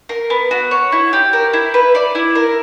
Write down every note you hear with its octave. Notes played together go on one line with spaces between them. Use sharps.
A#4
B3
F#4
C#5
E4
G4
A#4
E4
B4
D5
E4
A#4